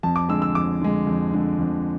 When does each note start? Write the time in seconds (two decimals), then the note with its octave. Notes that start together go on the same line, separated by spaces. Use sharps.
0.03 F2 A5
0.16 D6
0.29 D3 G#3 E6
0.42 E6
0.55 F2 D6
0.81 D3 G#3
1.07 F2
1.34 D3 G#3
1.59 F2